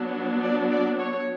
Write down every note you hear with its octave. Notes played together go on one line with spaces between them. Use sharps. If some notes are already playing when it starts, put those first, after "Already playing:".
Already playing: F#3 B3 D4
D5
D5
C#5